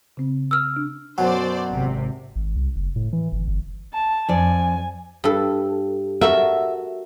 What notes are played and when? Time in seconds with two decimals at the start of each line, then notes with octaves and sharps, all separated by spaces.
0.17 C#3 C4
0.51 E6 F6
0.76 D4
1.18 F#2 B2 F#3 C5 D5
1.72 G#1 C3
2.36 G#1
2.56 C2
2.76 F#1
2.96 A2
3.13 E3
3.32 G1
3.48 G1
3.94 A5
4.29 F2 D5 G#5
5.24 G2 A4
6.21 F#4 A4 A#4 E5